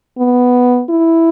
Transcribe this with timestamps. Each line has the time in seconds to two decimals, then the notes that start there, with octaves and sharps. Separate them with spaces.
0.18 B3
0.89 E4